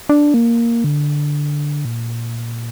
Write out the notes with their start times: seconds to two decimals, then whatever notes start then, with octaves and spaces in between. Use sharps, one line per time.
0.09 D4
0.34 A#3
0.84 D3
1.85 A#2